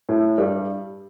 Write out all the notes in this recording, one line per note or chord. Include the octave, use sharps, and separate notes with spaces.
A2 A3
G2 G3